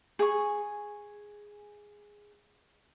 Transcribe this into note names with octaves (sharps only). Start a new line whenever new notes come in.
G#4 G#5 C#6